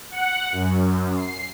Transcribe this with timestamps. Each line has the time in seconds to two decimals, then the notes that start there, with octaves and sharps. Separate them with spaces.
0.11 F#5
0.52 F#2
1.16 C7